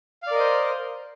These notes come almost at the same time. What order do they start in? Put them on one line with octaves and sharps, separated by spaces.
F5 D5 A#4 D#5 C5